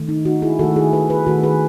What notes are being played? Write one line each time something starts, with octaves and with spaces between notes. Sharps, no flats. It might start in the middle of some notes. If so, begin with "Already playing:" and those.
Already playing: D#3 A3
D#4
D#4 F#4
E4 G#4
D#3 A3 F#4 A4
E4 G#4
G#4 B4
G#4 B4
D#3 A3 F#4 A4
G#4 B4